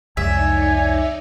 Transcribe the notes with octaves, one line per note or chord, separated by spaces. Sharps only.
C2 F2 G#3 D#4 C#5 D5 E5 G#5